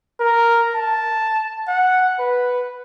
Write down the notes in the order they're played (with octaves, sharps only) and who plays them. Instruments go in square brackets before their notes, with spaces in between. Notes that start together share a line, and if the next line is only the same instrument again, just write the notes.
[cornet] A#4
A5
F#5
B4